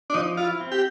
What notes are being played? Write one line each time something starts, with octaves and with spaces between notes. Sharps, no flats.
D4
F3 D#4
E4 F4
C4
G4